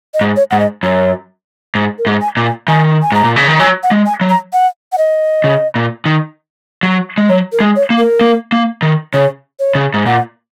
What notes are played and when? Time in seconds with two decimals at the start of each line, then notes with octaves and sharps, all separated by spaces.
0.14 D#5
0.21 G#2
0.36 C#5
0.51 G#2 F#5
0.60 D#5
0.83 F#2 C#5
1.75 G#2
1.98 A#4
2.06 G#2
2.21 G#5
2.37 A#2
2.45 G#5
2.68 D#3 G#5
3.02 G#5
3.12 G#2 A#5
3.24 A#2
3.36 C#3
3.48 D#3
3.60 F#3 G#5
3.83 F#5
3.91 G#3
4.06 G#5
4.21 F#3
4.29 A#5
4.53 F#5
4.92 F#5
4.98 D#5
5.44 C#3
5.75 A#2
6.06 D#3
6.83 F#3
7.18 G#3
7.29 F#3 C#5
7.52 A#4
7.60 G#3
7.76 C#5
7.90 A#3
7.98 A#4
8.21 A#3
8.52 A#3
8.82 D#3
9.13 C#3 C#5
9.60 C#5
9.75 C#3
9.94 G#2
10.06 A#2 F#5